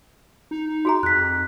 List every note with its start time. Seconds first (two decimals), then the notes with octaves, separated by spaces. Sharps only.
0.51 D#4
0.85 F#4 G#4 A#5
1.03 F2 F#6 B6